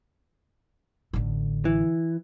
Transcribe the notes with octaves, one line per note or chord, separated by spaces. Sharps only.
A1 D3
E3